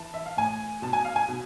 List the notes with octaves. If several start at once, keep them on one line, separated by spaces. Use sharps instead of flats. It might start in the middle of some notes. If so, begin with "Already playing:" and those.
Already playing: E3 A5
E5
F5
A2 G#5
B2 A5
G#5
F5
G#5
B2